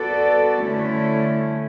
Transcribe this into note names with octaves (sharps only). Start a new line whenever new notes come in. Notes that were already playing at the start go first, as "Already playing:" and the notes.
Already playing: B3 F#4 A4 D5
D3 A3 C#4 E4